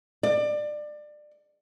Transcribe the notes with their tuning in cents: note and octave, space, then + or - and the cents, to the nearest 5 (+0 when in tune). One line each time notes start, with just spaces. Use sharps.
D5 +25